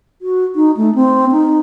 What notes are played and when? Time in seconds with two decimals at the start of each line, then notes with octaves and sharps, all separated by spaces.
0.22 F#4
0.56 D#4
0.77 A3
0.95 C4
1.32 D#4